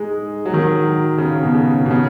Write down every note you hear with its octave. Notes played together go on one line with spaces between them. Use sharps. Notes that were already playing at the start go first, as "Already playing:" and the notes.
Already playing: G#3 D#4
F#3
D#3
F#3
C#3
B2
C#3
B2
C#3